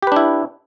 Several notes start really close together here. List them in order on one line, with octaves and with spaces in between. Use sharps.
G4 B4 D4 E4